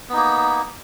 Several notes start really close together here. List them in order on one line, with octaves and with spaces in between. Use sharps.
B3 D#4 A#3